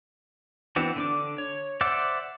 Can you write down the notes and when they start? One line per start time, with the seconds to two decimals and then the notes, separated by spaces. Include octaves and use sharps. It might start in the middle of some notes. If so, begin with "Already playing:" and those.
0.76 E3 B3 C4 D4 F#4
0.96 D3 D4 D6
1.38 C#5
1.81 C5 D5 E5 F#5 D6